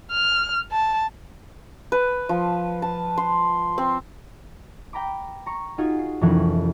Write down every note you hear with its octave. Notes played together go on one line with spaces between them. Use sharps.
F6
A5
B4
F3
A5
C6
C4
G5 A#5 B5 D6
A#5 C#6
D#4 F4 F#4 G#4
C7
F1 C2 F2 E3 C#4 F#6